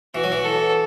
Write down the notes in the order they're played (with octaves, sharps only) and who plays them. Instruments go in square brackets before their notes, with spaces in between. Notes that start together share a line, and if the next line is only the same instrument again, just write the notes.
[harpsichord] E3 [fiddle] F#4
[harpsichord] F#3
E3
[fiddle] A4